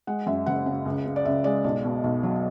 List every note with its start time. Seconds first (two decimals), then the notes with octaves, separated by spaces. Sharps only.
0.07 G#3 F#5
0.26 F#2 E5
0.46 F#1 F#5
0.66 C#3
0.85 C#2
1.06 C#3
1.16 D5
1.25 C#2 E5
1.44 G#3 D5
1.64 B1 D5
1.85 B2
2.04 B1
2.23 F#3